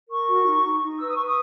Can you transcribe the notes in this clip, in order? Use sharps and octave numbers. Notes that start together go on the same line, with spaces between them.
A#4 C#6
F#4
D#4
D#4
D#4
B4 E6
D#6
B4 C#6
D#6